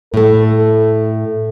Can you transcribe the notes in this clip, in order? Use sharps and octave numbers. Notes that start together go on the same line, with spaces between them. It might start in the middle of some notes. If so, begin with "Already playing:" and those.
A2 A3 A4